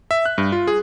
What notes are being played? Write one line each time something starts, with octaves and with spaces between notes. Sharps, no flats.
E5
F#6
G2
F4
G#4